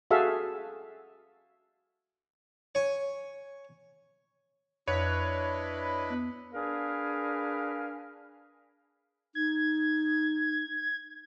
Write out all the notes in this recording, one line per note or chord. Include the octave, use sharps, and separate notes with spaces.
F#4 G#4 A4 E5 F5
C#5 G#5
F2 D4 E4 B4 C#5 D#5
B3
D4 G#4 A#4 B4 F5 G#5
D#4 G#6